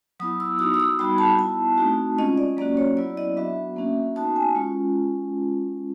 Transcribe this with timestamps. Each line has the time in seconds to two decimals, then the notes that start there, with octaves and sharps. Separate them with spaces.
0.20 F#3 B3 E4 D#6
0.40 E6
0.59 B3 D#4 F#4 D#6
0.74 E6
0.80 D#6
0.99 G3 B3 D#4 F#4 B5
1.18 A5
1.39 B3 E4 A5
1.78 A3 C4 D#4 F#4
2.18 G#3 C#4 F4 D#5
2.38 D5
2.57 F#3 A#3 C#4 F#4 D5
2.77 C#5
2.97 F#3 B3 E4 D5
3.17 D#5
3.36 F#3 B3 D4 F#4 E5
3.76 A#3 C#4 F#4
4.15 B3 D#4 F#4 A5
4.36 G#5
4.55 G#3 C#4 F4